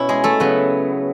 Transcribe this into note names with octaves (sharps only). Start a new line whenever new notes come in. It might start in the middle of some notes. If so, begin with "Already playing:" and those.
Already playing: B2 C#4 E4
G#3 G#4
A3 A4
C#3 F#3 B3